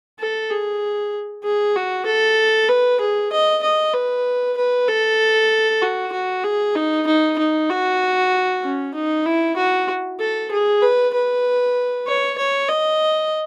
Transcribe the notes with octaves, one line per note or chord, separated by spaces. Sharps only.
A4
G#4
G#4
F#4
A4
B4
G#4
D#5
D#5
B4
B4
A4
F#4
F#4
G#4
D#4
D#4
D#4
F#4
C#4
D#4
E4
F#4
A4
G#4
B4
B4
C#5
C#5
D#5